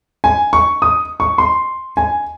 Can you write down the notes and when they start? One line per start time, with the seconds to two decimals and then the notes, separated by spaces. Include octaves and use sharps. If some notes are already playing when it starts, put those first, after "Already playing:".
0.24 G#5
0.53 C#6
0.82 D#6
1.20 C#6
1.38 C6
1.97 G#5